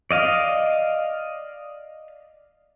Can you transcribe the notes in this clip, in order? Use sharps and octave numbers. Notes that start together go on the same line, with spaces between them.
D5 D#5 F5